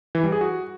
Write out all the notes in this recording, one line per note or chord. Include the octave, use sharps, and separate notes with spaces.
E3
G3
G#4
F#4